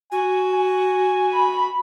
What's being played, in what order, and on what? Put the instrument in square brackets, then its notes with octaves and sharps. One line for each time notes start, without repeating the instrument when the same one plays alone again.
[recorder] F#4 [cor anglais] G#5
[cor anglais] G#5
[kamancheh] B5